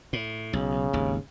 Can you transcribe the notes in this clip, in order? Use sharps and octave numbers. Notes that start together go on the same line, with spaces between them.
A2
B1 C#3
G#1 D#2